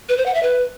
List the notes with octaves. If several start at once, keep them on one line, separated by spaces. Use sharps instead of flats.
B4
C5
F#5
E5
B4